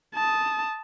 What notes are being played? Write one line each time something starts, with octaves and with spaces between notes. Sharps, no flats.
A5 D#6